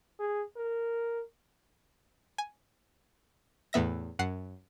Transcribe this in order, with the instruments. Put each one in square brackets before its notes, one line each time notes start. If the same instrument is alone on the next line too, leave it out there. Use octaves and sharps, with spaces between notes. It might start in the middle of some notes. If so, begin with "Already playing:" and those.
[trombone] G#4
A#4
[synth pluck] G#5
E2 A2 B3 E5 A#6
F#2 F#5 C7